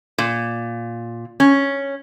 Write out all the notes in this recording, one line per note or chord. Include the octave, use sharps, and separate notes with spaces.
A#2
C#4